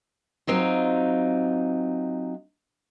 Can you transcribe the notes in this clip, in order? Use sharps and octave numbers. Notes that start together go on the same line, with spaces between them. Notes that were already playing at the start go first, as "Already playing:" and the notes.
F#3 C4 D#4 F4